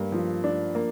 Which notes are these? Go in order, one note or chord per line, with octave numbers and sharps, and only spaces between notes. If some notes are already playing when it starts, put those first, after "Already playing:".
Already playing: G2 A#3
F3
D4
A#3